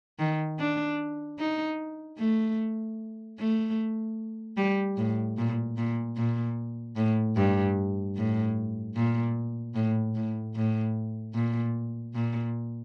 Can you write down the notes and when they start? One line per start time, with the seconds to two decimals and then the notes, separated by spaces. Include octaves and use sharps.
0.19 D#3
0.59 D4
1.39 D#4
2.18 A3
3.39 A3
4.57 G3
4.97 A2
5.38 A#2
5.77 A#2
6.17 A#2
6.96 A2
7.36 G2
8.16 A2
8.96 A#2
9.75 A2
10.15 A2
10.55 A2
11.34 A#2
12.14 A#2